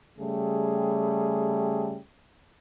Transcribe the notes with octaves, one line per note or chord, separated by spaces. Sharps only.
C#3 G3 A3 G4 G#4